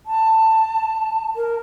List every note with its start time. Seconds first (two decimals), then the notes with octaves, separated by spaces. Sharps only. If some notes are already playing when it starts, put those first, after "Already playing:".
0.06 A5
1.36 A#4